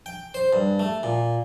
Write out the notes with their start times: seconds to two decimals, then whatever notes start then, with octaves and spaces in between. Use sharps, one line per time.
0.06 G5
0.34 C5
0.53 G2
0.80 A3
1.03 A#2